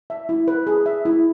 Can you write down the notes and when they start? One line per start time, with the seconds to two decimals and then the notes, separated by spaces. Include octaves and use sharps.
0.10 E5
0.29 E4
0.48 B4
0.67 G#4
0.86 E5
1.05 E4